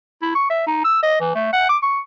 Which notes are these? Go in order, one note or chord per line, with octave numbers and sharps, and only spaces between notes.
E4
C#6
E5
D#4
E6
D#5
E3
A3
F#5
D6
C#6